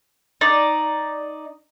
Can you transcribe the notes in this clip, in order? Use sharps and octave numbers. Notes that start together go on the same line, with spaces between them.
D#4 D5